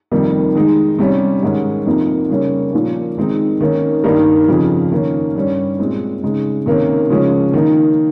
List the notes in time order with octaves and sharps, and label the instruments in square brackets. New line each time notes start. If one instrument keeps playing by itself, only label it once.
[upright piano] F2 C3 D#3 G3 A#3
D#3 G#3 D#4
C3 G3 C#4
G#2 D#3 G#3 C#4
F2 C3 F3 A#3 D#4
C#3 G3 A#3 C#4
A#2 F3 A#3 C#4
D#3 G#3 C4 D#4
D#3 A#3 C#4
G2 D#3 G3 A#3 D#4
F2 C#3 F3
D#3 A#3 C#4
G2 G3 C#4
A#2 G#3 C4
C#3 G#3 D#4
C3 D#3 A#3 C#4
C#3 F3 G#3 C#4
D#3 A#3 D#4